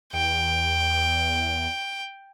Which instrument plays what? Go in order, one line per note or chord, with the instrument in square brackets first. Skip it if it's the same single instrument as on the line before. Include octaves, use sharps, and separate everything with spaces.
[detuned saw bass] E2 [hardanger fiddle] G5